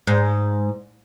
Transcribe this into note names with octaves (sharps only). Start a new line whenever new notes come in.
G#2